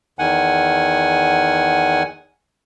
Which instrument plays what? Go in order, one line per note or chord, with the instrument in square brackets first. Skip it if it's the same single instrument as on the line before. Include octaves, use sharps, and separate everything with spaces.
[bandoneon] E2 D#3 F#5 G#5